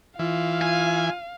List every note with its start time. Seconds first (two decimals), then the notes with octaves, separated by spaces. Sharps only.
0.19 E3 F4 F5
0.61 F4 G#5